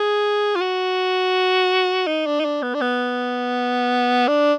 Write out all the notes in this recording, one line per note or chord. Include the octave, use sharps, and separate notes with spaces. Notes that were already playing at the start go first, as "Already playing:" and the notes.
Already playing: G#4
F4
F#4
D#4
D4
D#4
D4
B3
D4
B3
D4